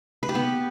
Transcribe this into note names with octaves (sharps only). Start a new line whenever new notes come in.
B4
G4
B3